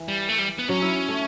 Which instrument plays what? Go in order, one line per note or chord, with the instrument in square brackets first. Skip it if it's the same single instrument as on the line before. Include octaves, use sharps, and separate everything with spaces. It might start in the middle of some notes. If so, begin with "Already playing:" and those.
Already playing: [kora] E3
[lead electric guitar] G3
A3
G3
B3
[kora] F#3 [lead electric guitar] C#4
[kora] E4
A3